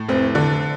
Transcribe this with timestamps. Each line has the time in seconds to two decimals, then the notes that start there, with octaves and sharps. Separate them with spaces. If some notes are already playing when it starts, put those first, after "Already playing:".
Already playing: A2
0.08 F1 C4
0.35 D3